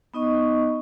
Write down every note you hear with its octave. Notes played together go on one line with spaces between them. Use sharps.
B3 D#4 D#5 C#6